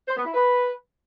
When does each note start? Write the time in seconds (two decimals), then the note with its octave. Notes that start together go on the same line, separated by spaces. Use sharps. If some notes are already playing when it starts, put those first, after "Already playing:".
0.07 C5
0.16 B3
0.25 E4
0.34 B4